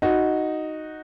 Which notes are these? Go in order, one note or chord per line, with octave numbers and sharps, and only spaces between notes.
D#4 F#4